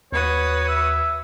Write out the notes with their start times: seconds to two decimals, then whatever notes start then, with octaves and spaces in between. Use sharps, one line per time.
0.12 D#2 F#4 B4 C#5 D#6
0.68 E5